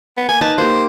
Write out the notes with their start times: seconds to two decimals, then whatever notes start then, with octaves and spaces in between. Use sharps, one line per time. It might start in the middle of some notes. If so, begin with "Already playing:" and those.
0.17 B3
0.29 A#3 G#5
0.41 D#4 B4 A5 A#5
0.58 A#3 G4 C5